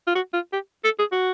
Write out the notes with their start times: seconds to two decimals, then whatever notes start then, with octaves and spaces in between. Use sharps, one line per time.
0.07 F4
0.15 F#4
0.34 F4
0.53 G4
0.84 A4
0.99 G#4
1.12 F#4